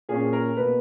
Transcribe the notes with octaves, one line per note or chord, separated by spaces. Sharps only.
A#2 A#3 C#4 G#4
G#4
A#4
B2 A#3 B4